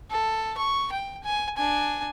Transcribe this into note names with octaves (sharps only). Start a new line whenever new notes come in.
A4
C#6
G5
G#5
D4 G#5